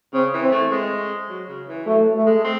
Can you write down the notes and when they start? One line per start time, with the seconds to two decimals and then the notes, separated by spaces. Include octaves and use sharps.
0.14 C#3 C4
0.33 E3
0.42 C4
0.52 A3
0.71 G#3
1.29 F#3
1.48 C#3
1.67 E3
1.86 F#3 A3
2.16 A3
2.26 G#3
2.44 C4